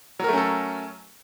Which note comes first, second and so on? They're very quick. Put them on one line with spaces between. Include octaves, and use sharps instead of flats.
F#3 A#4 A3 C#4 A4